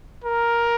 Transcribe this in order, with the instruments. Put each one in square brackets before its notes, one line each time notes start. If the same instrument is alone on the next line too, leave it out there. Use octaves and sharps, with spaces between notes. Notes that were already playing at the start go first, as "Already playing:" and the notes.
[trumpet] A#4